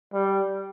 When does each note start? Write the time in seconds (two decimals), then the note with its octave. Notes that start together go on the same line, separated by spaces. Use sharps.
0.13 G3